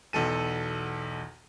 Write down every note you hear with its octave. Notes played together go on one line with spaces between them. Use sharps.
B1 E2 A4 D#7